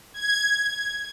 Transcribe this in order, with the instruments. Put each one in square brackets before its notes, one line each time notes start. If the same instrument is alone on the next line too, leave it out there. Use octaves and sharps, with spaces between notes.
[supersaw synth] G#6